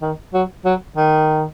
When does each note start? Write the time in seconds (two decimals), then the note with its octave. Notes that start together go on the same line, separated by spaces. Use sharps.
0.02 D#3
0.34 F#3
0.65 F#3
0.97 D#3